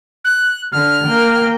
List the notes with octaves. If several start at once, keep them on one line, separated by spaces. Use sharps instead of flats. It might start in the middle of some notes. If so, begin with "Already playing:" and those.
F#6
D3 F6
A#3 G5